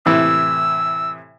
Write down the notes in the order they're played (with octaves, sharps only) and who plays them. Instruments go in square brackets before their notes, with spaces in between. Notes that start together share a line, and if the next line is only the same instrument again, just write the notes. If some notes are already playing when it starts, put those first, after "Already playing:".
[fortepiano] A2 C3 E3 [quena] E6